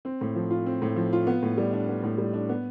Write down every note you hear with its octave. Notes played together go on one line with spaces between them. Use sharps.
C4
A2
F3
F4
C4
A2
F3
F4
B3
A2
G3
D4
B3
A2
G3
D4
B3